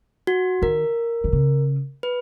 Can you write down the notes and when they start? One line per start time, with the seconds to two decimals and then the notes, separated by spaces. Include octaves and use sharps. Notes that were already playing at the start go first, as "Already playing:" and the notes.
0.27 F#4
0.62 D#3 A#4
1.24 D#3
1.33 C#3
2.03 B4